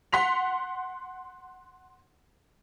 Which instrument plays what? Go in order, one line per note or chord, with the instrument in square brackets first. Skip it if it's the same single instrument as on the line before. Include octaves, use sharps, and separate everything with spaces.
[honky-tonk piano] F#5 C6 B6 F7